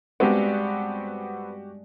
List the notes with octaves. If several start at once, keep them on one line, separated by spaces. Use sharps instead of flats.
G2 G#3 B3 C4 D4 F#4 G4